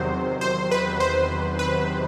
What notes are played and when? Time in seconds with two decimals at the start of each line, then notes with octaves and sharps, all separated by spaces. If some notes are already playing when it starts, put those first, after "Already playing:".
Already playing: E2 C3 D#3 F#3 C5
0.41 C5
0.71 B4
1.00 C5
1.59 B4